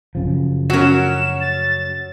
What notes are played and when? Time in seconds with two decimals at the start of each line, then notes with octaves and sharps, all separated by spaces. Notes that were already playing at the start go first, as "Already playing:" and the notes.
0.15 F#2 C#3 F3
0.70 F#3 C#4 F#4 A#4 E7
1.41 A6